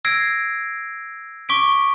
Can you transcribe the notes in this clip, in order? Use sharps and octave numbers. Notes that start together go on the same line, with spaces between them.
E6 G#6 A#6 C7 D7
C#6 D6 B6 D7